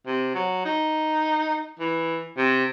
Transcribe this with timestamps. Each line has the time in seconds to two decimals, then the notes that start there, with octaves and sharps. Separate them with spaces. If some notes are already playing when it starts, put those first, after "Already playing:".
0.07 C3
0.35 F#3
0.65 D#4
1.79 E3
2.38 C3